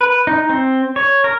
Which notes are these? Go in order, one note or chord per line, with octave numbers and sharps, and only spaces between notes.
B4
D#4
C4
C#5
A#4